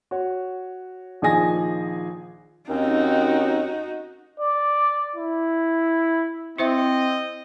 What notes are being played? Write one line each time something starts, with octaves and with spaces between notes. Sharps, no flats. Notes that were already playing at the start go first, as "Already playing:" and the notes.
F#4 C#5
A#1 D#3 F3 G#4 G#5 A#6
D#2 C4 C#4 D#4 F#4
D5
E4
C4 E4 C5 D#5 E5